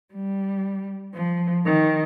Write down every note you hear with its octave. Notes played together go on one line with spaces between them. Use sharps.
G3
F3
D#3